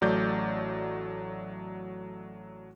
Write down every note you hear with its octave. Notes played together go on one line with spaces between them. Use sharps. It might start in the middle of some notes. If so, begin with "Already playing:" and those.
A1 F#3 A3 D5 G6